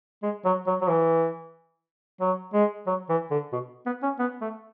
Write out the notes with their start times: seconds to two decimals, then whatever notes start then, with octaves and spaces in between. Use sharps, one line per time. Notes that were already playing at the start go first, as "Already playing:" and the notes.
0.23 G#3
0.45 F#3
0.67 F#3
0.81 F#3
0.89 E3
2.21 F#3
2.53 G#3
2.87 F#3
3.09 E3
3.31 D3
3.52 B2
3.86 B3
4.03 C#4
4.19 B3
4.41 A3